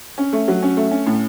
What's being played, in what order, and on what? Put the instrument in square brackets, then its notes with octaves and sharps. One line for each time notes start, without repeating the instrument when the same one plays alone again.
[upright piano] C#4
A3
F#3
C#4
A3
C#4
A2